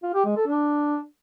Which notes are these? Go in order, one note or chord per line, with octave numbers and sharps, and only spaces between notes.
F4
G4
G#3
A4
D4